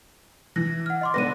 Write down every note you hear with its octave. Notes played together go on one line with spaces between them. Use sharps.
E3 A#6
F#5 F6
D#5 C6 D6
D3 B3 B4 A#6 D#7